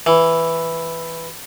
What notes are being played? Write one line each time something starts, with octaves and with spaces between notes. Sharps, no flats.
E3